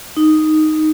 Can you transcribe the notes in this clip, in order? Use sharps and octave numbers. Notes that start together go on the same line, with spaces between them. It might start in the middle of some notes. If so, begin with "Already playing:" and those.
D#4